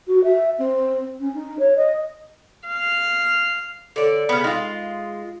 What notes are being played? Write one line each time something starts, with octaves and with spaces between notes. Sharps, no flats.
F#4
E5
C4
C#4
D#4
C#5
D#5
F5
D3 A4 C#5 D5
C#3 B3 B5 F6
G#3 D#4 F4 G5